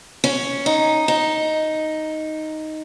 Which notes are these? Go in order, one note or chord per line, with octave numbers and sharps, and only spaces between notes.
C#4
D#4
D#4